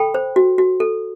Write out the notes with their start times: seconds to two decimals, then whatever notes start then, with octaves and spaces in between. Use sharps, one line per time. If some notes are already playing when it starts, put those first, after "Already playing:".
Already playing: A4 G5 B5
0.14 C5
0.36 F#4
0.58 F#4
0.80 A4